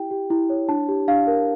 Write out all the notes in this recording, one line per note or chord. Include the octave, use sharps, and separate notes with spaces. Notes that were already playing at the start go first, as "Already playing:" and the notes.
Already playing: E4 G4 G5
G4
E4
C#5
D4 A5
G4
D4 F5
A#4